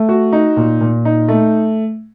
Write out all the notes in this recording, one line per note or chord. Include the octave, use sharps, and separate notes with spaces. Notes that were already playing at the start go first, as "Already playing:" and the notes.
Already playing: A3
F#4
D#4
A#2
A#2
D#4
A3